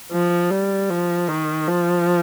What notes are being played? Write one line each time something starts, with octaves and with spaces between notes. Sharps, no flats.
F3
G3
F3
D#3
F3